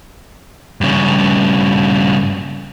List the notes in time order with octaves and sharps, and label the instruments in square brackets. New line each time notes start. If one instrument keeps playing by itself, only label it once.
[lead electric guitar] G2 C#3